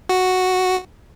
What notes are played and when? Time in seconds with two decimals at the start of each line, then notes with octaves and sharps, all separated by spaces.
0.09 F#4